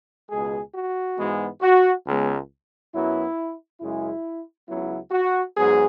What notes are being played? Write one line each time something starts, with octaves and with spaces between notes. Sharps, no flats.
C#2 B2 G#3 G#4
F#4
G#2 E3 G#3 B3
F#4
C#2 C#3 G#3 B3
F#2 F#3 B3 E4
F#2 C#3 G#3 E4
C#2 C#3 F#3 B3 E4
F#4
G#2 F#3 B3 G#4